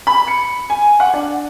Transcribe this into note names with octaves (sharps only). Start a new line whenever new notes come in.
B5
C#7
G#5
F#5
D4